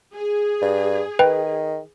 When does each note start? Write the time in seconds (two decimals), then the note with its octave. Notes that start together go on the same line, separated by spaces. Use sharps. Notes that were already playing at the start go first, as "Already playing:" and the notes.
0.14 G#4
0.62 G2
1.19 D#3 B4 G5